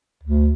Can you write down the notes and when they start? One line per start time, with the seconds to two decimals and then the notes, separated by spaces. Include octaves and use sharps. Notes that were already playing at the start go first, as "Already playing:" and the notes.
0.23 D2